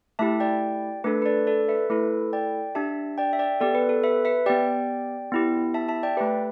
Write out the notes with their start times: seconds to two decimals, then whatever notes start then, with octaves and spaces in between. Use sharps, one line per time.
0.19 A3 E4 G4 E5 A5
0.40 D5 G5
1.04 A3 D4 A4 B4
1.22 B4
1.26 A4 D5
1.47 A4 D5
1.68 B4 E5
1.90 A3 E4 A4 B4
2.33 D5 G5
2.75 D4 G4 E5 A5
3.18 D5 G5
3.33 E5
3.39 D5 G5
3.60 B3 G4 A4 D5
3.75 B4
3.89 A4
4.03 B4 E5
4.25 B4 E5
4.46 B3 G4 D5 G5
5.32 B3 E4 G4
5.74 E5 A5
5.88 E5 A5
6.03 D5 G5
6.17 A3 G4 B4 E5